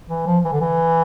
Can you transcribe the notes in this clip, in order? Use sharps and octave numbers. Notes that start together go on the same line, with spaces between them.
E3
F3
E3
D3
E3